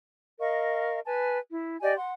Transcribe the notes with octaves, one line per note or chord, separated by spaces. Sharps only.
A#4 D#5 F5 C#6
B4 G#5 A5
E4
G4 D5 D#5 G#5
F#5 C6